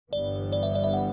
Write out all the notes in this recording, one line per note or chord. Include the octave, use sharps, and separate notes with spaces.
G1 G2 E3 G3 B3 D5
D5
E5
D5
E5
F#5